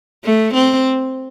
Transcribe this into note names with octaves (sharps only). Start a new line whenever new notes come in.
A3
C4